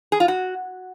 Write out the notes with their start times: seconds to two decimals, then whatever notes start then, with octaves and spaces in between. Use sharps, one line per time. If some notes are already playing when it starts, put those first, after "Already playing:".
0.12 G#4
0.20 F4
0.28 F#4